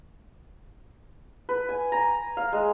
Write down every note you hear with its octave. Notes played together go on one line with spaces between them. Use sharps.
B4
G#5
A#5
F5
G#3